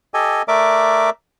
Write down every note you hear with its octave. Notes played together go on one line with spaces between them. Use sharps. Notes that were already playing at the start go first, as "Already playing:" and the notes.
G4 A4 D#5 G#5
A3 A#4 D5 E5 D6